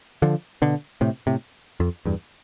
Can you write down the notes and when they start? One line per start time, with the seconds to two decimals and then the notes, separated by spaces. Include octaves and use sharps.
0.22 D3 F3
0.62 B2 D3
1.01 A2 C3
1.27 A2 C3
1.80 F2
2.05 E2 G2